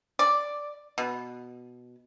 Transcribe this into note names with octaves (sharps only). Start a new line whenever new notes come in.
D5
B2